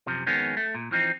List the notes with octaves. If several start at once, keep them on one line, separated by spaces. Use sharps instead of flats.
F#2 C3 F3
F2 D#3 G#3 B3 C#4
A3
A#2
E3 F3 C4 D#4